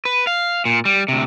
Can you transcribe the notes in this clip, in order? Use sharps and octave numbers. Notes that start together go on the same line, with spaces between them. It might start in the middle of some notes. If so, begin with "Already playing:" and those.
B4
F5
A#2
G3
D2 C3